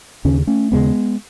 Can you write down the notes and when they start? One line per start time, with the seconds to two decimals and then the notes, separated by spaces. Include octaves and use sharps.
0.25 D#2 C#3 C#4
0.47 A3 C#4
0.72 D#2 C#3 G#3 B3